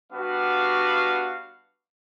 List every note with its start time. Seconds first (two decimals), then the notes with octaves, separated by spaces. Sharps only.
0.11 G3 B3 D4 F#4 F5